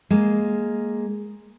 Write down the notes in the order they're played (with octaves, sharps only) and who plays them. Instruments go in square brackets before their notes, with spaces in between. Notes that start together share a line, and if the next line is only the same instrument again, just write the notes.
[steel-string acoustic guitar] G#3 A#3